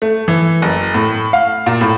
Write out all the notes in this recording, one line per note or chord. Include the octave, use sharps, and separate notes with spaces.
A3
E3
F#1
A2
F5
A#2
A2